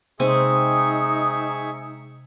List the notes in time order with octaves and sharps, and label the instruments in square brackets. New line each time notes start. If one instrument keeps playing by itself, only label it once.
[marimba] C3 [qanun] G#3 C4 G#5 [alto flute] D#4 [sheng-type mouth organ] G#4 E5 C#6